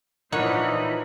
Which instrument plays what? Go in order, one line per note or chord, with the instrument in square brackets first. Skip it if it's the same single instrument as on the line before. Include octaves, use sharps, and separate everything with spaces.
[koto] A#2 C#5 F#5 [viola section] E3 F3 B5 [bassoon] D4 [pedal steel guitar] D#4